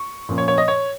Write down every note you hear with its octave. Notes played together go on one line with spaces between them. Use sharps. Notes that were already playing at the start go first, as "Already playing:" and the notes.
Already playing: C#6
A#2 F3 A#3 C#4
C#5
C#5
D#5
C#5